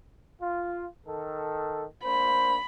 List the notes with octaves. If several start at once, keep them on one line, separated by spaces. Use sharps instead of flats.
F4
D#3 A4
A#3 D4 C5 B5